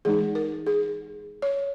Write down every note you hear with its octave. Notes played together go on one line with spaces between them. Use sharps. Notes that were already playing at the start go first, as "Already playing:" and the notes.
E3 G#3 D#4 G#4
A#4
G#4
C#5